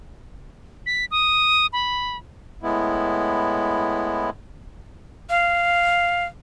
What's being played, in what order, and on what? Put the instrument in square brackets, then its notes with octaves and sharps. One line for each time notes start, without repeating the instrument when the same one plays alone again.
[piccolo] B6
D#6
B5
[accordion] A2 G#3 B3 E4
[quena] F5